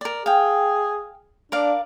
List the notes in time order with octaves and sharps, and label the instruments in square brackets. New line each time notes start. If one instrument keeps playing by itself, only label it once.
[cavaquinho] A#4 D5
[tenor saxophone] G#4 [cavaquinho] F5 G5
[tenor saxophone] D4 [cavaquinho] A#4 D5 F5